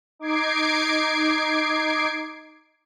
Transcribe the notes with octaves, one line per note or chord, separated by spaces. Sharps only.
D#4 D6 G#6 C7 D7